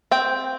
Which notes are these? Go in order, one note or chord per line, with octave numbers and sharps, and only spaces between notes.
C4 G5